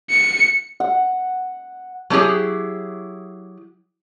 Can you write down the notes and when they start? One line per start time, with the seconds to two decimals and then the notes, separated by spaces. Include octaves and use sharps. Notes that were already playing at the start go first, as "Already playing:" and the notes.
0.10 C#7
0.80 F#5
2.10 F#3 A#3 E4 G4 G#4